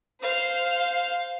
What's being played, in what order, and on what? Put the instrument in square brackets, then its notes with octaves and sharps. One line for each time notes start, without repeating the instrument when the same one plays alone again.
[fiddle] C5 F5